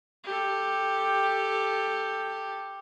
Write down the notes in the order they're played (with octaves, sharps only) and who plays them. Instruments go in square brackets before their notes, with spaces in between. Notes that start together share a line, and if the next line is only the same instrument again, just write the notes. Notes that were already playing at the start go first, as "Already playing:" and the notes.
[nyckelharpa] G4 A4